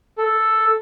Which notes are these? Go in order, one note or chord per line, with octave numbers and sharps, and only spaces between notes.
A4